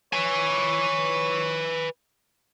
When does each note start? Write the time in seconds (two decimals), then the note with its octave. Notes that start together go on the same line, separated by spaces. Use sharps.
0.13 B4 C#5 G#5